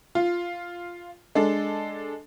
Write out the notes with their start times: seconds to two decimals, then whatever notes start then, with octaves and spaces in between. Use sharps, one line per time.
0.15 F4
1.35 G#3 D4 A4